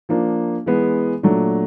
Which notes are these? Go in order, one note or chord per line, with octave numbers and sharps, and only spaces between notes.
F3 A#3 D4
E3 G#3 B3
A#2 F#3 A3 D4